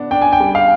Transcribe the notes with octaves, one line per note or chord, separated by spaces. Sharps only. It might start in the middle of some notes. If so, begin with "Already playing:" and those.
Already playing: B3 D4
D4 G5
G#5
G5
G3
F5